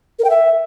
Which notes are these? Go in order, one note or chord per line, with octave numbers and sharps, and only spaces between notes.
A#4
G5
E5